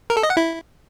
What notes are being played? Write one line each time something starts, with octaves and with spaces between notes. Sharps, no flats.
A#4
A4
D#5
F#5
E4